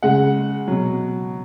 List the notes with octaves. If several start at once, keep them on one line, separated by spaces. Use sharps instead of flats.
C#3 G#3 F#5
B2 F#3